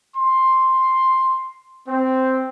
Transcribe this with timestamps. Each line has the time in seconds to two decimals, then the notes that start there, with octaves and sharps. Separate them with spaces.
0.16 C6
1.88 C4